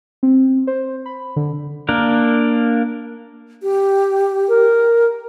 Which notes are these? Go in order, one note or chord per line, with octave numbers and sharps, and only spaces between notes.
C4
C5
B5
D3
A#3 D4 A#4
G4
A#4